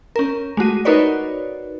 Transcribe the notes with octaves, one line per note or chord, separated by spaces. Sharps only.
C#4 A#4
G#3 A3 F#4 D#7
D#4 F#4 A#4 B4 C#5 D5